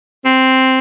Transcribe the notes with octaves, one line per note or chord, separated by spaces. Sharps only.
C4